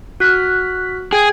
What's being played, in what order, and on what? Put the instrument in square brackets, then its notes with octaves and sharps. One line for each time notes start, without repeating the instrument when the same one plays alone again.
[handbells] F#4 F6 [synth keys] F#6 B6
[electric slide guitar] G#4 [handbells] G5 G#6